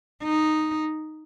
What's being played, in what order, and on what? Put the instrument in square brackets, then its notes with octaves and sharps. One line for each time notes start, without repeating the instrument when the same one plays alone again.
[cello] D#4